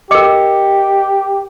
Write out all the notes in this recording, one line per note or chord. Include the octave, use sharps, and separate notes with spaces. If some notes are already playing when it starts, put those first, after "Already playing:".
G4 A#4 D#5 D6 C#7